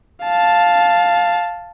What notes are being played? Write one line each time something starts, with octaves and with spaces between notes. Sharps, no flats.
F5 A5